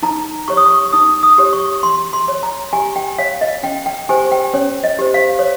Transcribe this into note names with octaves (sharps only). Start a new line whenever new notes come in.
D#4 A#5
G4 C#5 C#6
D#6
C#6
D#4 D#6
D#6
G4 C#5
C#6
G4 C6
C6
C#5
A#5
G4 G#5
G5
C#5 F5
D#5
C#4 G5
G5
G4 C5 G#5
G5
C#4 C#5
D#5
G4 C5
F5
C#5